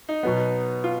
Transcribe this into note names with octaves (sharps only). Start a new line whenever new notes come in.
D#4
B2 F#3 B3
F4